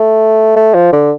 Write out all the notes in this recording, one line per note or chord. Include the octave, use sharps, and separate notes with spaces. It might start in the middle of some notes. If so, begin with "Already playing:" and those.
Already playing: A3
A3
F3
D3